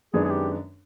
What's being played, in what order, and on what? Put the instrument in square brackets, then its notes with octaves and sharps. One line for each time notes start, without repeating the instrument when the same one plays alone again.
[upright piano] F#2 D#3 G#3 B3 D4 [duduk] G#4
[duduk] G#4
G4